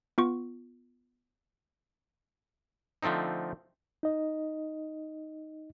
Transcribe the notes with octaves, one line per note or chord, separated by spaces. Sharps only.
B3 F4 C#6
D3 F3 A3 C4 D#4
D#4 D#5